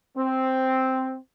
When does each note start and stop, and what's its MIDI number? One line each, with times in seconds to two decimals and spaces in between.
0.17 1.17 60